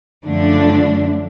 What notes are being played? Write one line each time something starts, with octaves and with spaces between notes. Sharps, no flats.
F#2 D3 F3 A3 D4